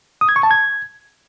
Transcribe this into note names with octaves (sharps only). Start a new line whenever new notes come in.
D#6
G#6
C#6
A5
G#6